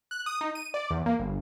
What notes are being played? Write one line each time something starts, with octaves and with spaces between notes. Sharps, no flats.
F#6
D#6
D#4
D#7
D5
E2
A#3
G1